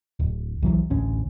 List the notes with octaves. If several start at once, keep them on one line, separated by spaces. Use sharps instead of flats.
D1
B1 E3 F#3
A1 D2 C#4